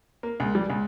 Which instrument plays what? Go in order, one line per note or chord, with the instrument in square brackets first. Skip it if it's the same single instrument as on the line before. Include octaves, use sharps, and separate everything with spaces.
[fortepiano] A#3
C#2
G3
C#2